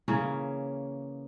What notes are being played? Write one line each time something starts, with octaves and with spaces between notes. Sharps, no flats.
C#3 E3 A#3 C#4